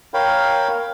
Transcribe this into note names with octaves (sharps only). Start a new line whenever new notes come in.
A#4 C#5 F5 G5 B5